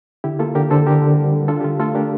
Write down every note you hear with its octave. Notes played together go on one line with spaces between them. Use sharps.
D3 E4 G4
A#3 F4 A4
D3 G4 A#4
D3 A4 C5
D3 G4 A#4
D3
G3
G3
D4 F4 A4
G4
D3 F4
A3 F4 A4
D4 G4 A#4